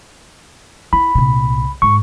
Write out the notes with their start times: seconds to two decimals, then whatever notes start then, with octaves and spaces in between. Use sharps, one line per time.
0.93 E4 B5
1.15 C2 A#2
1.82 G#2 C#6